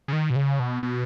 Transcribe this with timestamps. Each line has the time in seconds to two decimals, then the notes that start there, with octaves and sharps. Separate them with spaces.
0.08 C#3
0.13 D#3
0.30 B2
0.36 C#3
0.60 B2
0.83 B2